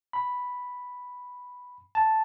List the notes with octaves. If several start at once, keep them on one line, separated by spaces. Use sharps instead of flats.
B5
A5